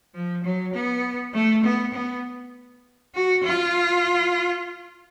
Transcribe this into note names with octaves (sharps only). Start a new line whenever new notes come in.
F3
F#3
B3
A3
B3
B3
F#4
F4